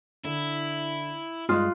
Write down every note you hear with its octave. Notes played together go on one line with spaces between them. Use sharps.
D3 E4
G2 G#3 F4 D#6 F#6